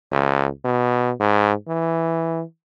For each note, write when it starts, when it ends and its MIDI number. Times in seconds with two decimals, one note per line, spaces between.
0.12 0.47 37
0.64 1.11 47
1.20 1.53 44
1.68 2.43 52